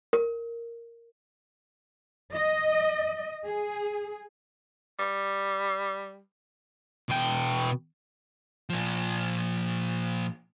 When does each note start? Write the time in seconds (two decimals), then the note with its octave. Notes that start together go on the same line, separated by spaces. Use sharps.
0.13 A#4
2.36 D#5
3.45 G#4
4.99 G3
7.09 B2 G5
8.70 A#2 F3